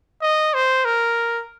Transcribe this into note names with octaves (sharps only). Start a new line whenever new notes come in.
D#5
C5
A#4